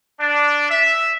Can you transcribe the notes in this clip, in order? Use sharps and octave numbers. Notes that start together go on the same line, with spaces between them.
D4
E5